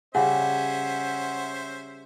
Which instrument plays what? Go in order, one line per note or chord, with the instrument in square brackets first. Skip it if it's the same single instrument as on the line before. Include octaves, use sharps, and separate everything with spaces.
[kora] C#3 G3 [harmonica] C#4 C5 E5 [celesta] F#5